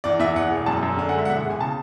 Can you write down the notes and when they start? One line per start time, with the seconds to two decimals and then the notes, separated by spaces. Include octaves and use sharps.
0.04 E2 D5
0.19 E2 E5
0.36 E2 F#5
0.51 E1
0.66 F#2 A5
0.83 F#2
0.98 D3 G#5
1.09 F#5
1.14 G#3 E5
1.25 F#5
1.29 E1 E5
1.40 F#5
1.46 E1 G#5
1.61 C#3 A5